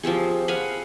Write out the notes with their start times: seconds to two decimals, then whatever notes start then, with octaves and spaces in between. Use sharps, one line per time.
0.03 F3 C4 G4 G#4
0.48 F5 F#5 G#5 B5